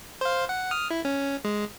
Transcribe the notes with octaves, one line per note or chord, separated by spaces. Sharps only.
C5 F5
F#5
D#6 F6
E4
C#4
G#3